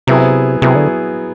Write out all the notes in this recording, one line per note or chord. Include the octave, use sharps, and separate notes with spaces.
C3 F#3 B3 E4 G#4
C3 F#3 B3 E4 G#4
D3